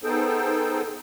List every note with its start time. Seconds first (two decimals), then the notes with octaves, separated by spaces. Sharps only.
0.04 B3 D#4 G#4 A4 C5 G5